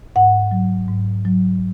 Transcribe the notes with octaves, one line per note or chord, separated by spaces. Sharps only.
G#2 F#5
F#3
G#2
F#3